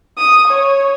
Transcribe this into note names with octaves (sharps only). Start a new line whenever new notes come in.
D#6
C#5